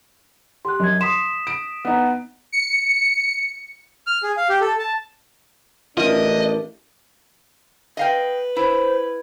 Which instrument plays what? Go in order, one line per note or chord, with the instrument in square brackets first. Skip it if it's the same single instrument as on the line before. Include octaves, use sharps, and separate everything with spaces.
[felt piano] G4 [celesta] C6 F#6
[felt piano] F#2 [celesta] D#5 G#6
[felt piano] C6 [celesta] D#6 B6 E7
[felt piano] D7
B3 D#4
[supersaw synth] C#7
[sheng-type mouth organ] F6
G#4
F5
G4
A4
A5
[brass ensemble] A1 D4 [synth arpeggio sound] F4 [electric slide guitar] A#4 E5 [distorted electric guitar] D#5
[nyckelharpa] B4 [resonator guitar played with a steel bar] D#5 F5 G5
[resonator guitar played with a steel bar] E4 [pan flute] C5